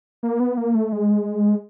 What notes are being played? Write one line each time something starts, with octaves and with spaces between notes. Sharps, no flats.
A#3
B3
A#3
A3
G#3